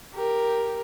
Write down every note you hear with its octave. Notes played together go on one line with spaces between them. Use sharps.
G4 A#4